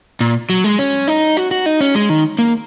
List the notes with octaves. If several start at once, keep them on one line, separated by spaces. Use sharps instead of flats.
A#2
F#3
G#3
C#4
D#4
F#4
F#4
D#4
C#4
G#3
D#3
A#3